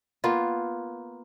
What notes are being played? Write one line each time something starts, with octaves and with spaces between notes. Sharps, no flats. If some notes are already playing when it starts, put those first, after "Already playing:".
A#3 B3 F4